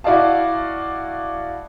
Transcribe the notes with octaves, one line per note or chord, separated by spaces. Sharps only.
E4 F#4 D5 D#5 F5 A5